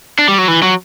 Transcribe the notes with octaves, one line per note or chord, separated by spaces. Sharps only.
D4
G3
F#3
E3
F#3